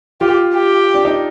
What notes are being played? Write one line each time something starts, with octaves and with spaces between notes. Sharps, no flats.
F4 G4
G4
D4
D#4